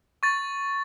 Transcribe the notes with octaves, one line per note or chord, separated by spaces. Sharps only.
C#6 A6